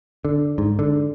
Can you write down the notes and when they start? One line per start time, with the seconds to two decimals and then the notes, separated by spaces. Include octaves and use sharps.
0.25 D3
0.58 G#2
0.79 D3